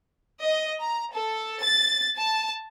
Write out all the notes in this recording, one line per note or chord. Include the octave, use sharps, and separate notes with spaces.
D#5
A#5
A4
A6
A5